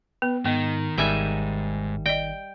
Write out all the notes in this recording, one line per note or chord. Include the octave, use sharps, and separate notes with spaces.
B3 B4
G#2 D#3 B3 D#5
G#1 G#2 D#3 G3 E5 G#5
D5 D#5 G5